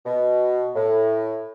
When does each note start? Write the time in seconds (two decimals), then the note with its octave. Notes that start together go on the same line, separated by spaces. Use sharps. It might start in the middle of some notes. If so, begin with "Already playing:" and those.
0.06 B2
0.74 A2